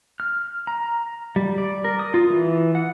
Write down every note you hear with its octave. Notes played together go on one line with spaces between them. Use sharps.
F6
A#5
G3
D5
A#4
D#6
F4
E3
F#5